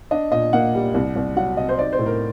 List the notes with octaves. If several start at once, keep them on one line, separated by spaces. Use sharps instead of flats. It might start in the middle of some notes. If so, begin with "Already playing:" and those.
D4 D#5
A#2 D#5
A#3 F#5
G3
C2
C2
F#3 F#5
C3 D#5
C5
D#4 D5
C5
A2
A#4